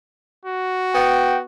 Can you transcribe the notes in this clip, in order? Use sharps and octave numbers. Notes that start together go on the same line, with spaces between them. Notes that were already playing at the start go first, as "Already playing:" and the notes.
F#4
B3 G5